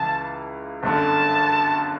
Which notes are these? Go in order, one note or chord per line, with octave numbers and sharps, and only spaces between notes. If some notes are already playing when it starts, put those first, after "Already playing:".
Already playing: C#2 C#3 E3 A5
G1 F#2 D3 A5